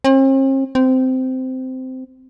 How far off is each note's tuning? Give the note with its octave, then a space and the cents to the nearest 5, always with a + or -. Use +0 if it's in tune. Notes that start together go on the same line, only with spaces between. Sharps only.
C4 +45
C4 -15